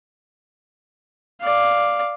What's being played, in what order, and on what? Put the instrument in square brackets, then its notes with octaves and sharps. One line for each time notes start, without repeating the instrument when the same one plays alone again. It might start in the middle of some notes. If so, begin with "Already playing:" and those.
[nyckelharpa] D5 F5